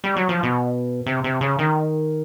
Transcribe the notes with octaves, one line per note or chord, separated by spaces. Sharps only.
G3
F#3
F3
B2
C3
C3
C#3
D#3